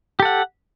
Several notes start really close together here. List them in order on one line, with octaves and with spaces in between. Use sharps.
G4 A4 F#5